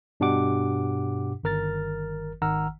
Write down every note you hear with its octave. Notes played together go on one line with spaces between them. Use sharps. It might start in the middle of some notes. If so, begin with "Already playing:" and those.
G2 B2 D4 G4 F#5 D6
G1 D#3 A#4 F6 A6
G#1 D#3 F#5 A#5 E6 F6